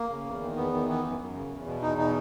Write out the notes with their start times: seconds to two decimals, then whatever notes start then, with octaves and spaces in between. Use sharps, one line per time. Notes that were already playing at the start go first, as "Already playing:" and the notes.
Already playing: A#3
0.09 C#3
0.26 E2
0.41 D#3
0.56 E2 B3
0.73 D#3
0.88 E3 B3
1.04 F#2
1.19 F#2
1.35 C#3
1.51 E2
1.66 B2
1.82 E2 D#4
1.97 B2 D#4